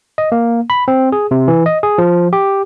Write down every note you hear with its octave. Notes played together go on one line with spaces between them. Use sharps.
D#5
A#3
B5
C4
G#4
C3
E3
D#5
G#4
F3
G4